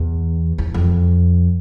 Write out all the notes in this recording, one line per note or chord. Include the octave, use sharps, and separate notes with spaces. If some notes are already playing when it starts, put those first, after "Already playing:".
Already playing: E2
E2
F2